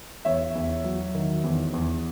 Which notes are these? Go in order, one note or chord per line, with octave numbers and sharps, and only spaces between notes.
E2 C#5 E5
E2
F#3
D#3
E2
E2